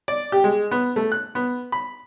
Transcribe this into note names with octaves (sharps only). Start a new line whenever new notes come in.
D5
G4
G#3
B3
A3
F#6
B3
B5